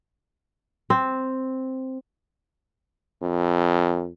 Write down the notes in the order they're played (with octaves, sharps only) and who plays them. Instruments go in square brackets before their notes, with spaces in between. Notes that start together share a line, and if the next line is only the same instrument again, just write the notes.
[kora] C4
[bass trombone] F2